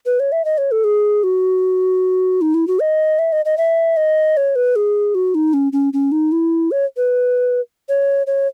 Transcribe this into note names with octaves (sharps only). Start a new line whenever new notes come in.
B4
C#5
E5
D#5
C#5
A4
G#4
F#4
D#4
E4
F#4
D#5
E5
D#5
D#5
E5
D#5
C#5
B4
G#4
F#4
D#4
C#4
C#4
C#4
D#4
E4
C#5
B4
C#5
C#5